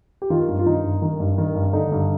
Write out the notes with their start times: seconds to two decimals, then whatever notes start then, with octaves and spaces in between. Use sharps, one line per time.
0.22 G4
0.30 D#3 F4
0.49 G2
0.59 F4
0.66 D#3 D#4
0.84 G2
1.02 D#3
1.20 G2
1.38 D#3
1.55 G2
1.73 D3 D#4
1.92 G2